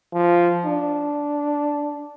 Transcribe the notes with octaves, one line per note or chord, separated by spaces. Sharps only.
F3
D4